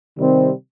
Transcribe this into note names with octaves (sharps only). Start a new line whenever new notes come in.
C3 D#3 G3 C4